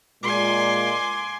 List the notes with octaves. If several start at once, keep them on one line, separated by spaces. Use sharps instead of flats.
A#2 G#3 G#5 C6 D6